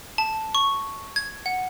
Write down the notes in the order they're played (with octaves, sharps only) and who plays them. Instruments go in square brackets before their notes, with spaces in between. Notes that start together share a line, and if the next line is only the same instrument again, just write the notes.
[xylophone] A5
C#6
G#6
F#5